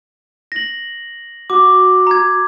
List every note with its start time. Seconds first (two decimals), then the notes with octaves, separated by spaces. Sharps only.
0.52 A#6 F#7
1.50 F#4 D6
2.07 A#5 G#6